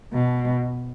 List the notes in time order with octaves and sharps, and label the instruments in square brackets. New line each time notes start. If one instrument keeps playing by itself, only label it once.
[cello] B2